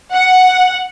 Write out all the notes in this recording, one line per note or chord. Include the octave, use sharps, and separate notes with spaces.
F#5